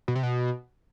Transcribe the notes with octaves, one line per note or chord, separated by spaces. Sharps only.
B2
C3
B2